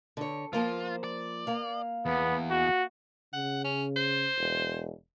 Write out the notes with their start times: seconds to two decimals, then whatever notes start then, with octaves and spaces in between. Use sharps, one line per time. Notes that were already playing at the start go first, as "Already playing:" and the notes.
0.17 D3 C#5
0.53 F3 A#3 F4 C5
1.04 D5
1.47 A#3 F5
2.06 E2 B3
2.50 F#4
3.34 C#3 F#5
3.64 C#4
3.96 C5
4.37 E1